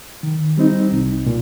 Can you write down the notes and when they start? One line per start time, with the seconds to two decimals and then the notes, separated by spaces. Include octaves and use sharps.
0.23 D#3
0.58 G3 C4 D#4
0.92 C2
1.26 A#2